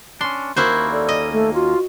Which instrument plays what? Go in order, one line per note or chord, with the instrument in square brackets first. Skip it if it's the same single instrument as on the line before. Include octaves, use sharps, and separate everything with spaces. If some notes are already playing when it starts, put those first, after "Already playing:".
[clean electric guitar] C#4 D4 [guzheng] C6
[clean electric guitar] D#2 A#3 C#4 [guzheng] E4 F#4 C5 [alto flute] A#4
[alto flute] A4 [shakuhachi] D5
[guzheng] D#5
[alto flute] A3 [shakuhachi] A4
[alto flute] F4 [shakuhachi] F#4